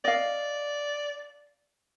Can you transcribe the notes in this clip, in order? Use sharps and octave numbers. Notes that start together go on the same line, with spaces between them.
D5 D#5 F5